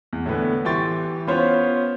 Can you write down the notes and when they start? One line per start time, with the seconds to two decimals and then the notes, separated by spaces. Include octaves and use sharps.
0.13 E2
0.26 A2 D3 B3
0.65 E3 G4 G5 C6 C#6 A6
1.27 B3 C#4 F4 C5 C#5